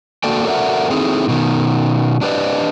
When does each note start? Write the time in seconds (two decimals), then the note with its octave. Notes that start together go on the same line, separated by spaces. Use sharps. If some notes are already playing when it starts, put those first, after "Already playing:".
0.24 A#3 F#4 A4 D5 G5
0.44 F#4 A4 A#4 D5 E5 F#5
0.90 C4 D#4 E4 G#4 A4
1.29 B2 D#3
2.21 D4 G4 B4 D5 D#5